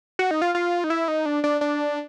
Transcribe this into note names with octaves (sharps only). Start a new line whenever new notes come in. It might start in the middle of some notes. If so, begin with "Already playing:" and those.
F#4
D#4
F4
F4
D#4
E4
D#4
D4
D4
D4